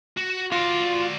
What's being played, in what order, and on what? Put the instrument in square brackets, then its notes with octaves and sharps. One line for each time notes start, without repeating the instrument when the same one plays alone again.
[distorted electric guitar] F#4
[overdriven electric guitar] F4 [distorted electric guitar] F#4 D5